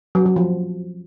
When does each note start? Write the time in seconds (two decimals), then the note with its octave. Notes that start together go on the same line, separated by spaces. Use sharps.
0.15 F#3
0.26 F#3
0.36 F3